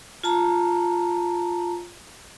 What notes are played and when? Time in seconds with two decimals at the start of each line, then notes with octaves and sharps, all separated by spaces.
0.24 F4 A5 A#5